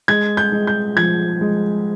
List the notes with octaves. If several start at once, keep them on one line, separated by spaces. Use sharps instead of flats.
G#3 G#6
G6
G#3
G6
F3 G#6
G#3